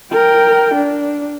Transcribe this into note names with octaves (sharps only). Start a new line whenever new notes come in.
A#4 G5
D4